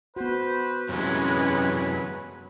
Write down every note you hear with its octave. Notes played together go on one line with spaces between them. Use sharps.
B3 F#4 B4 C5
F#2 C3 E3 F#3 G#3 C#4 B4